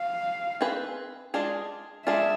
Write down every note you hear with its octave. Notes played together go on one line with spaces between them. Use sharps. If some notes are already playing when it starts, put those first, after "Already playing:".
Already playing: F5
C4 G#4 B4
G#3 D4 F4 G#4
G#3 D4 F4 G#4 E5